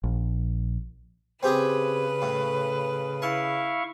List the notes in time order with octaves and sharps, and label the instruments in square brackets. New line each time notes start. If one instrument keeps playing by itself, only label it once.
[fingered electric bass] A#1
[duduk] C#3 [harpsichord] C4 G4 G#4 [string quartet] B4
[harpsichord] A2
[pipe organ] E4 F5 C#6 [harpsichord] A5